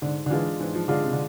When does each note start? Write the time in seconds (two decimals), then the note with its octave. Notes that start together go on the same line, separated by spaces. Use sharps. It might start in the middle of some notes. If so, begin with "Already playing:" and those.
0.01 G#2 D3
0.26 D3
0.30 E3 G#3 D4 F4
0.60 G#2 E3
0.75 F3
0.88 D3 G#3 D4 F4
1.03 C3
1.13 D3